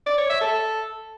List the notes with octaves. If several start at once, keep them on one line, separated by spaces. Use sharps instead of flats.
D5
C#5
E5
A4